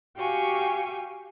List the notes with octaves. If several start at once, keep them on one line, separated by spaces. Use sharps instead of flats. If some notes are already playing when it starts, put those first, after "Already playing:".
F#4 G4 F5 G5 G#5 C#6